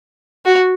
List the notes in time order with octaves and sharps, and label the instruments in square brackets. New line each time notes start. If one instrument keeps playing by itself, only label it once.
[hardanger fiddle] F#4